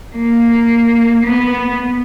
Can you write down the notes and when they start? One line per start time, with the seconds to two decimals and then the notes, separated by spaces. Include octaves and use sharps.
0.15 A#3
1.25 B3